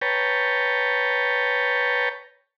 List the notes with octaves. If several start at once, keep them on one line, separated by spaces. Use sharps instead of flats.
B4 C#5 G5 A5 A#5